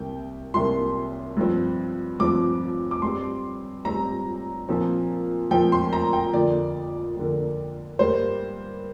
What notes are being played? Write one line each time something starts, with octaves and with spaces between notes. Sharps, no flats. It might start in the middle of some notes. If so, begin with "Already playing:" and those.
Already playing: C2 C3 A#3 G5
C2 C3 A#3 C6
G2 F3 C4
G2 F3 C4 D6
D6
G2 G3 C4 C6
G2 G3 C4 A#5
A#2 F3 C4
A#2 F3 C4 G5
C6
A#5
G5
F2 D3 A#3 D5
F2 D3 A#3
G2 G3 A#3 C5